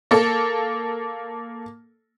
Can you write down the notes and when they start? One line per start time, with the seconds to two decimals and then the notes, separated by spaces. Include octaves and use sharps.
0.11 A#3 A4